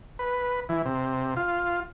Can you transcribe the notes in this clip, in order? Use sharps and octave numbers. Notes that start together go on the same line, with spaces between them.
B4
E3
C3
F4